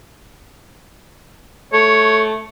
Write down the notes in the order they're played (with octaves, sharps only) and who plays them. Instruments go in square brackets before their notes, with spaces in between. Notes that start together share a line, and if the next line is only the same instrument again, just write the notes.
[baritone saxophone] A3 [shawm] C#5